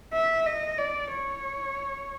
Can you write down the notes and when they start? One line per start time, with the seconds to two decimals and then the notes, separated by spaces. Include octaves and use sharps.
0.14 E5
0.46 D#5
0.78 D5
1.11 C#5